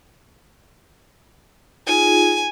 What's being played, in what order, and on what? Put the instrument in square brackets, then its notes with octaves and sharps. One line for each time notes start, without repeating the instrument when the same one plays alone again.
[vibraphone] D#4 F4 G#4 [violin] G#5